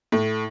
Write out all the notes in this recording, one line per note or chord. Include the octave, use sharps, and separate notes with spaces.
A2